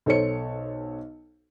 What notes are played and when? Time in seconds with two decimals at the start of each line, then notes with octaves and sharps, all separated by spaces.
0.06 B1 A4 C5 C#5 C#7